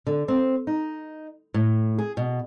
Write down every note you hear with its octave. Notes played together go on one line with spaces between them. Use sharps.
D3
C4
D#4
A2
G#4
B2